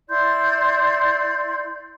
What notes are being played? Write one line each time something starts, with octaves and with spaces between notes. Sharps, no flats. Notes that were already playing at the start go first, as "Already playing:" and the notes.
E4 D5 C6 G6